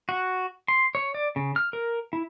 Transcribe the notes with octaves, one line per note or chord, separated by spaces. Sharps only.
F#4
C6
C#5
D5
C#3
F6
A#4
E4